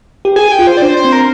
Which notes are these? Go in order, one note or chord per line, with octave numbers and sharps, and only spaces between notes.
G4
G#4 G#5
G5
F4
C5
D5
D4 C5
C5
C4
A#4